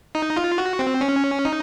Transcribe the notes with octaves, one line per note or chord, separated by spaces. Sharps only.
D#4
F4
F#4
C4
C#4
D#4